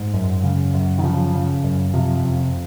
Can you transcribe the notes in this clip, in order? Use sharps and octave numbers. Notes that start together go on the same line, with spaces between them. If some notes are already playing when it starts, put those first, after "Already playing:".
Already playing: G#2
F#2
C#3
F#2
D#3
C#3 F3
C#3
F#2
C3 F3
F2